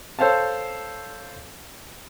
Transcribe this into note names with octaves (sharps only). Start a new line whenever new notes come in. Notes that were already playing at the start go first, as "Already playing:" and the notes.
A4 C5 C#5 F5 A5